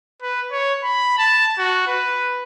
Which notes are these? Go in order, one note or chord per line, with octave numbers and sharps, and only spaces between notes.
B4
C#5
B5
A5
F#4
B4